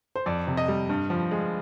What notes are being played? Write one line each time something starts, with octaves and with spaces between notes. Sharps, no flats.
C5
F2 D5
C3
D#5
G3
G2
F3
G#3